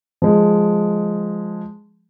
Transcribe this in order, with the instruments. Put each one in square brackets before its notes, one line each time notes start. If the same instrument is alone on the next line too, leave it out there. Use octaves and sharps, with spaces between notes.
[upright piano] F3 G#3